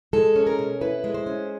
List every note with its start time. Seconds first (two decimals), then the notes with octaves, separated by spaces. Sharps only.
0.13 G#3 A4
0.36 C#4
0.47 A#4
0.59 B2
0.81 E4 B4
1.04 G#3
1.14 C5
1.26 C#4